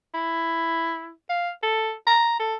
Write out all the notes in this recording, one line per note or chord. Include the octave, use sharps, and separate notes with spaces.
E4
F5
A4
A#5
A4